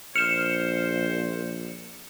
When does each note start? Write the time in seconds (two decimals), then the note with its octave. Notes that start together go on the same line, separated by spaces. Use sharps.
0.16 A#1 C5 F6 C#7 E7